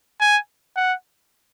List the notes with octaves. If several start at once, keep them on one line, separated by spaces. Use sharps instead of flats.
G#5
F#5